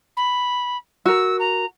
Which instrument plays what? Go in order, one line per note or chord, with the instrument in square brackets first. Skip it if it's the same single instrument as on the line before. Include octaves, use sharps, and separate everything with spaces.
[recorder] B5
[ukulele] F#4 A#4 [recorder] E6
[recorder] A#5